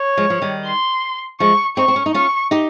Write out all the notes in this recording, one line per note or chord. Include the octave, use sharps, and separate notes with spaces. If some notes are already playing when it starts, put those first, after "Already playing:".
Already playing: C#5
F3 G#3
F3
D#3 G3
C6
F3 G#3 C#6
C4 D#4 C#6
C4
C#4
D#4
C#4 F4 C#6
D#4 G4